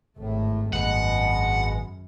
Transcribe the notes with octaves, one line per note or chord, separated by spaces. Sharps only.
G#1 A2 A3
G#1 F#2 B2 G#3 B3 F#5